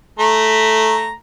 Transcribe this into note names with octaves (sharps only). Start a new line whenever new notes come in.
A3 A#5